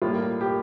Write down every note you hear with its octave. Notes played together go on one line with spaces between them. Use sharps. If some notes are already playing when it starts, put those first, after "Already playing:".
A2 G3 A#3 F4
G4